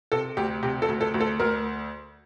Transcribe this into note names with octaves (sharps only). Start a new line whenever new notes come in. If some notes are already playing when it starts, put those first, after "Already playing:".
C3 A4
D2 G4
C3 G4
A4
D2
A4
D2
A4
D2 A#4